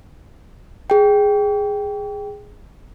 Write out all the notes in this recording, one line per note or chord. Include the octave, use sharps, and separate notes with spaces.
G#4 G5